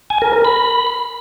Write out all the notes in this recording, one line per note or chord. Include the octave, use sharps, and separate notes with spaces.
G#5
A#4
A#4
B5